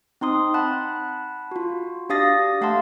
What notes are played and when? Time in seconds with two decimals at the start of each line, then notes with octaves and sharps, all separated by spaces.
0.21 C4 D#4 C6 D#6
0.54 F#5 A5 B5 F#6
1.51 F4 F#4
2.10 D4 G4 F5 D#6 A6 A#6
2.61 A3 F5 F#5 A5 C6